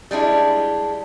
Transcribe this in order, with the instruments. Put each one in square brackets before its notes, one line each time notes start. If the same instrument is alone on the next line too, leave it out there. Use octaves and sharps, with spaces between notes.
[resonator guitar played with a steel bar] G3 G#3 D4 E4